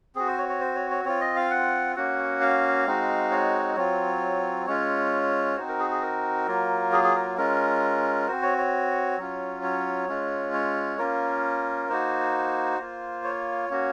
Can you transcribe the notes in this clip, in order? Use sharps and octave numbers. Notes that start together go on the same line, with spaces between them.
C4 F#4 G#4
C5
C#5
C#5
C5
C#5
C#5
C4 F4 C#5
D#5
F5
F#5
A#3 C#4 F#4 F#5
F5
G#3 C4 D#4 F#4
C#5
F#3 C4 F4 C#5
G#3 C#4 F4 C#5
C4 D#4 F#4 C5
A#4
G#4
G#4
A#4
F#3 A#3 F4
G#4
G#4
A#4
G#3 C#4 F4 A#4
C4 F#4 C5
C#5
C#5
F#3 C#4 F4
C#5
G#3 C#4 F4
C#5
A#3 C#4 F4 A#4
A#3 D#4 F#4 C5
A#3 F4
C#5
A#3 C#4 F#4